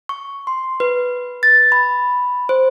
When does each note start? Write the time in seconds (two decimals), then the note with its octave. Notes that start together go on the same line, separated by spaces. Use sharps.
0.09 C#6
0.47 C6
0.80 B4
1.43 A6
1.72 B5
2.49 C5